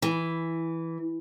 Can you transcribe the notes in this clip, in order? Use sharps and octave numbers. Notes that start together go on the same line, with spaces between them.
E3